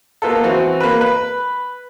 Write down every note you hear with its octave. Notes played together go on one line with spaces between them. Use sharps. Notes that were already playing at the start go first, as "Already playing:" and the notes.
A#3 B3 F4 A4
E3 C4 F#4
A#3 B4
B4